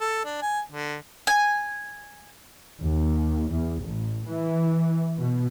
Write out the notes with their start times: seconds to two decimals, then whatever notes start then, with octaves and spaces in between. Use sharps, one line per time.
0.01 A4
0.25 D4
0.42 G#5
0.71 D3
1.27 G#5
2.80 D#2
3.51 E2
3.84 A1
4.25 E3
5.18 B2